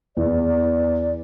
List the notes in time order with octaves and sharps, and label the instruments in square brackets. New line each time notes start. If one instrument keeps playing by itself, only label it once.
[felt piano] E2 [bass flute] D5